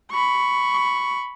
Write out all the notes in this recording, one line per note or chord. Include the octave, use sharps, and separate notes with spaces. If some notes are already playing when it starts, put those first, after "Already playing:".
B5 C#6